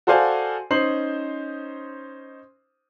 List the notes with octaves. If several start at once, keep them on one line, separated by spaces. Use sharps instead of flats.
F#4 A4 C5 D5 F5 G#5
C#4 D#4 C5 C7 F#7